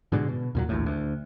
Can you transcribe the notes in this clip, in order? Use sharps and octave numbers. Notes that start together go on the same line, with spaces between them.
G#2 B2 D3 G#3
B2
D#2 A#2 F#3
A#1 D#2 A2
D2